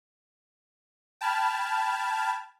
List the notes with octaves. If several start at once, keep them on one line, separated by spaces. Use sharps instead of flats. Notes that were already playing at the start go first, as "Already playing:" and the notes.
G5 A5 B5 F6 G#6